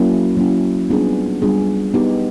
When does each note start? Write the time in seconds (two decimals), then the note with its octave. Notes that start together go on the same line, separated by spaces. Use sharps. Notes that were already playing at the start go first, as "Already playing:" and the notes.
Already playing: F#3 A#3 C#4 E4
0.37 F#3 A#3 C#4 E4
0.89 G3 B3 D4 F4 G#4
1.42 G3 B3 D4 F4 G#4
1.94 B3 D#4 G4